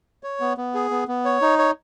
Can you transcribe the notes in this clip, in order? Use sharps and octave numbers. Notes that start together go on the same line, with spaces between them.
C#5
B3
B3
G#4
B3
B3
C#5
D#4
C#5